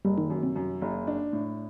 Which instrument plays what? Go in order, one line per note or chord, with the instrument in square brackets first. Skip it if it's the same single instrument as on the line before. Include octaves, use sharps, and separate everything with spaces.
[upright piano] F#1 [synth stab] G3
[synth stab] D#3
[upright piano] F#2
[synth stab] C3
[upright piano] F#2
F#1
D4
A2